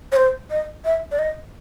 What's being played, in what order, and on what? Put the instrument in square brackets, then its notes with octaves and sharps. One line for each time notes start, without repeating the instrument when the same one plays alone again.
[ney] C#5
C5
D#5
E5
D5
D#5